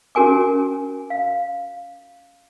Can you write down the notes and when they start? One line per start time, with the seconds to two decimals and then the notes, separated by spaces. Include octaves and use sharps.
0.15 C#4 F#4 A#4 G#5 D6
1.10 F5